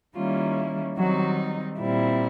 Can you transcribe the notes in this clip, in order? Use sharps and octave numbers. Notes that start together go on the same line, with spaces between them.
D#3 G3 A#3 C#4 E4 F4
D#3 F#3 G3 C4 D#4 F#4
A#2 G3 C4 E4